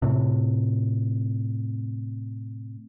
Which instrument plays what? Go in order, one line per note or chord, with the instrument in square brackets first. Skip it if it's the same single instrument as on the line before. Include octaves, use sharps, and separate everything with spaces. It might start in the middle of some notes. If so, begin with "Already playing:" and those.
[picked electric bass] A2 C3